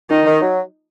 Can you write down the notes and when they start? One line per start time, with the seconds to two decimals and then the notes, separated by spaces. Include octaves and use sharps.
0.10 D#3 D#4
0.26 D#3
0.41 F#3